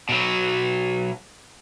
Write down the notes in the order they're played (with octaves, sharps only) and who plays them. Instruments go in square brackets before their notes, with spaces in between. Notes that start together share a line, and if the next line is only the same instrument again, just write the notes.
[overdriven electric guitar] B2 F#3